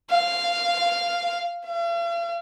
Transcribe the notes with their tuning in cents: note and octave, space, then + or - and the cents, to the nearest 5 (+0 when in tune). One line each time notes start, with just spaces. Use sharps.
F5 -10
F5 -45